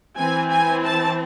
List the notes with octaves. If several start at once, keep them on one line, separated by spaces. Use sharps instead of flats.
E3 C4 G#5
G#5
A5